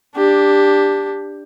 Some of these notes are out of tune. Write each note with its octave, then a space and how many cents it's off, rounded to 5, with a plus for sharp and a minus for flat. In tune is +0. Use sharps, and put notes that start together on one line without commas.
D4 +0 G4 +15